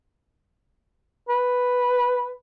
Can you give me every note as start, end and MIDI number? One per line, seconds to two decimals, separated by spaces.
1.29 2.33 71